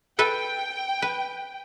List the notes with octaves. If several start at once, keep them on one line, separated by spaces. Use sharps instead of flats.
A4 B4 E5 G5
B4